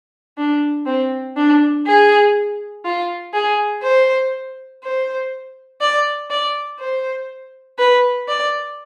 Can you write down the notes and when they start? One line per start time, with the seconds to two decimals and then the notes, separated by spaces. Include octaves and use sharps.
0.37 D4
0.86 C4
1.36 D4
1.86 G#4
2.85 F4
3.33 G#4
3.83 C5
4.83 C5
5.81 D5
6.30 D5
6.79 C5
7.78 B4
8.28 D5